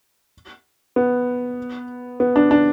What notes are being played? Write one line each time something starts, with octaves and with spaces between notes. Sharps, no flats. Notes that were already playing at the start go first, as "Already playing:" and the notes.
B3
B3
D4
D4